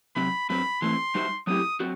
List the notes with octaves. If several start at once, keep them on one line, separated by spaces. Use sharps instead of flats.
C3 F#3 C4 B5
G2 F#3 C4 B5
E3 A3 C4 C6
G3 D#4 F#4 C5 E5
F#3 A3 C4 E4 G4 D#6
F#3 C4 F#4